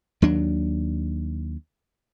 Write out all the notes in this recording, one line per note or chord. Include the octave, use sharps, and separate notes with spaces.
D#2 F#3 D4